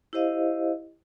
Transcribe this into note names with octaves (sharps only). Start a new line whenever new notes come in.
E4 G4 C5 D#5 F5